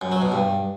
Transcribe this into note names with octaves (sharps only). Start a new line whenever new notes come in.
F#2
F#3
B2
G2